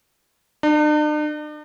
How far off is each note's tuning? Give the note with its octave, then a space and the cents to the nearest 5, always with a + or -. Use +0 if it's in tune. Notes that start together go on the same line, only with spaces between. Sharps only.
D4 +45